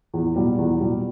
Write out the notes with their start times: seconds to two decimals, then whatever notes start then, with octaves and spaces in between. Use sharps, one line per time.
0.14 E2
0.36 B2 G3
0.59 E2
0.81 B2 G3